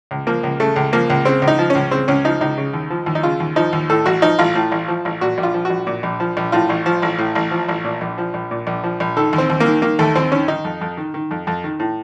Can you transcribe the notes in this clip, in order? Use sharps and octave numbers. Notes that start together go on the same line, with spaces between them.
C#2
F3 A#3
C#2
C#3 A3
C#2
F3 A#3
C#2
C#3 C4
C#2
D#4
F3
C#4
C#2
C#3 C4
C#2 C#4
F3 D#4
C#2 D#4
C#3
D#2
F3
D#2
D#4
C#3 F4
D#2
F3 D#4
D#2
A2 A4
A1 F#4
F3 D#4
A1 F4
A2
A1
F3
A1
A#2 F#4
A#1
F4
F3
F#4
A#1
A#2
A#1
F3
A#1
A2 F4
A1
F3
A1
A2
A1
F3
A1
A#2
A#1
F3
A#1
A#2
A#1
F3
A#1
D#3 A4
D#2
C4
D#2
A#3
D#3
D#3 A#3
D#2 A3
D#2 C4
D#3 C#4
D#3 D#4
F2
F2
D#3
D#3
F2
F2
D#3
A2